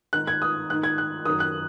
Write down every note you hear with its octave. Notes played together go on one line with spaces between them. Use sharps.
G#2 D#3 F#6
G#6
D#6
G#2 D#3 F#6
G#6
F#6
F#2 D#3 D#6
F#6